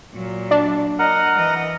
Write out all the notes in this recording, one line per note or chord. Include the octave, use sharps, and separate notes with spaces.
A#2 F#3
D4
A#4 D#5 F#5
E3 D#5